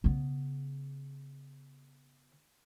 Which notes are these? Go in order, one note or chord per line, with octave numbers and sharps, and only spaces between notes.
C#3 B3